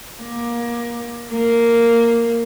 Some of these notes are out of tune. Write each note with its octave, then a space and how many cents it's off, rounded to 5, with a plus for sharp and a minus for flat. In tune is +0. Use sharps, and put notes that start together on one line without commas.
A#3 +25
A#3 -5